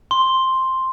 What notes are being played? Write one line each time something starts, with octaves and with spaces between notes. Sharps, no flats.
C6